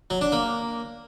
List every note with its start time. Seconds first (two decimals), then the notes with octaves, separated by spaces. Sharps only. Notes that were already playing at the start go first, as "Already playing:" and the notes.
0.10 F#3
0.21 D4
0.32 A#3